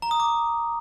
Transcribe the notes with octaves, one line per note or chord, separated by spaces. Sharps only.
A#5
D#6
D6